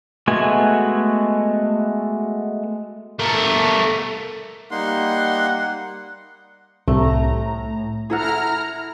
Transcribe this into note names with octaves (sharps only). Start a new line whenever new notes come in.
G#3 A3 B3 F#4 G#5
A3 A#4
G3 A#3 D#4 F#5 C6
C2 A2 A3 A#5
E4 G#4 A4 F#5 A#5 F6